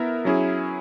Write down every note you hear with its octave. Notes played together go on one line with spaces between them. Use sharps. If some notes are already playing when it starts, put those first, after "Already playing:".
Already playing: B3 E4 A#4 E5
F#3 C#4 E4 G#4